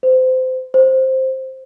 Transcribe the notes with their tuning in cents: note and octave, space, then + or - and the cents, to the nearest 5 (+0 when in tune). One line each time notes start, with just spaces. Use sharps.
C5 -25
C5 +5